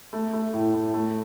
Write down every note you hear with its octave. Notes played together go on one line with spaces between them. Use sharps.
A3
A3
A2
A2
A3